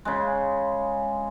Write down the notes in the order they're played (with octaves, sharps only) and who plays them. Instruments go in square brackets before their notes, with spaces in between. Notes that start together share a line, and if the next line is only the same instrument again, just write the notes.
[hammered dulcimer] C#3 G#3